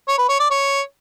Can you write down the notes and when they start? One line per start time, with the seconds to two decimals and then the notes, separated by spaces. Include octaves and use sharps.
0.08 C#5
0.18 B4
0.29 C#5
0.40 D5
0.51 C#5